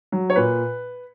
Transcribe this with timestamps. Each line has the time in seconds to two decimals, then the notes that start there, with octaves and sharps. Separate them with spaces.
0.12 F#3
0.30 C#5
0.36 A#2 B4